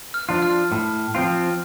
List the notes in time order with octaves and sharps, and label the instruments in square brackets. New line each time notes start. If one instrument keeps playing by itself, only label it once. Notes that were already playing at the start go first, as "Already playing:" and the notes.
[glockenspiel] F6
[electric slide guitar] F3 D4 F4
[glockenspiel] F6
[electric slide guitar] A2
F3 C4 F4